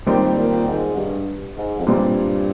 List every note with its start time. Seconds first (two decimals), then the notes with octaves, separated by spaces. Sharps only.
0.06 A#2 D#3 G3 C4 G4
0.37 A#2
0.67 G#2
0.96 G2
1.57 G#2
1.80 F2
1.87 G2 A#2 G3 C4